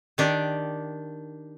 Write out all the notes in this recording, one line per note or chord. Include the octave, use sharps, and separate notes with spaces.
D#3 D4 G4